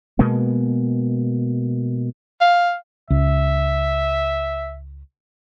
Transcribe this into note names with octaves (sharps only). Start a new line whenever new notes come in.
B2 G#3 A#3 B3
F5
C#2 E5